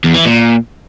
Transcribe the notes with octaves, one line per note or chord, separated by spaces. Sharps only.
E2
E3
A#2